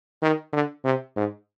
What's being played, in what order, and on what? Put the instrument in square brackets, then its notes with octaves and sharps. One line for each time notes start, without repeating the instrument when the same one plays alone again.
[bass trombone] D#3
D3
C3
G#2